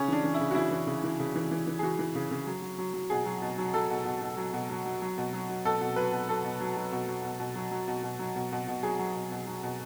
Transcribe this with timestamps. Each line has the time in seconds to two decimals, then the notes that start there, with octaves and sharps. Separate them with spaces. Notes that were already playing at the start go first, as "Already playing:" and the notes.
Already playing: C#3 C#4
0.08 E3 D4
0.23 E3
0.34 E4
0.40 C#3
0.51 F#4
0.55 E3 E4
0.71 E3
0.87 C#3
1.04 E3
1.19 C#3
1.36 E3
1.51 E3
1.67 E3
1.79 G#4
1.83 E3 F#4
1.99 E3
2.15 C#3
2.31 C#3
2.47 F#3
2.62 F#3
2.78 F#3
2.94 F#3
3.10 B2 G#4
3.26 F#3
3.42 B2
3.58 F#3
3.74 F#3 A4
3.90 B2
4.05 B2
4.22 B2
4.37 F#3
4.53 B2
4.70 F#3
4.86 F#3
5.02 F#3
5.18 B2
5.33 F#3
5.49 F#3
5.65 B2 A4
5.81 B2
5.96 F#3 B4
6.12 B2
6.29 F#3 A4
6.44 B2
6.60 F#3
6.77 F#3
6.92 B2
7.08 F#3
7.24 B2
7.40 B2
7.55 F#3
7.71 F#3
7.88 B2
8.03 B2
8.19 F#3
8.36 B2
8.52 B2
8.68 B2
8.83 F#3 G#4
8.99 F#3
9.15 B2
9.31 B2
9.47 F#3
9.63 B2